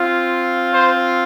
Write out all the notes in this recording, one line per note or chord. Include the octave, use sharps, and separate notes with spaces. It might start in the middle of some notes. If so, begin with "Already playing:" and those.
Already playing: C4 F4
C5